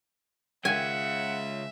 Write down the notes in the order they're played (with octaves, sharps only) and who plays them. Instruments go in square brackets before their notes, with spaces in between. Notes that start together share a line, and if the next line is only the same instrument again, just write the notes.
[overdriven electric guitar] C#3 G#3 [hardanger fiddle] E5 [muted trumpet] F#5 [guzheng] G#5